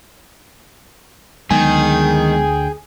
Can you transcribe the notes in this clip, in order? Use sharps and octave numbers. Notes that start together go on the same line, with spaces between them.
D2 D3 D#3 F#3 G#3 B3 G#4 G5